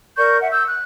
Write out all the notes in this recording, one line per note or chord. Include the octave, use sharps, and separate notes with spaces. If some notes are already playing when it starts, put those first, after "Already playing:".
A#4 D5 C#6 G6
E5 F#5
E6 G6
F#6